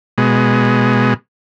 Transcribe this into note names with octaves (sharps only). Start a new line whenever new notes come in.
B2 G#3